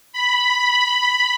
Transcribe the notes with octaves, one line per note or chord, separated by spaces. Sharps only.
B5